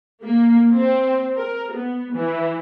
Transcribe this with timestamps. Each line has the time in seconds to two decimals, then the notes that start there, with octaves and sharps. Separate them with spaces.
0.23 A#3
0.76 C4
1.36 A#4
1.74 B3
2.13 E3